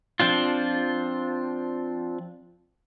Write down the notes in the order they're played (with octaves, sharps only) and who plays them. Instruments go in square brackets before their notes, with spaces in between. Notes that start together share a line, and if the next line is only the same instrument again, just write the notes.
[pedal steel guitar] F3 C4 D4 F4